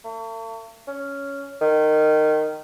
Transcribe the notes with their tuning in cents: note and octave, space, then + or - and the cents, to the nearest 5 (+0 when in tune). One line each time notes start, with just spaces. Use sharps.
A3 +45
C#4 +5
D#3 -15